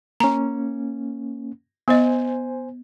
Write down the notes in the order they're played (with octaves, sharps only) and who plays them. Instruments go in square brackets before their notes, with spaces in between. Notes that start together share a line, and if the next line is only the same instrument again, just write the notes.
[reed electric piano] A#3 C#4 [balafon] A#5
[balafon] B3 D#5 [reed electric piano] C5 G#5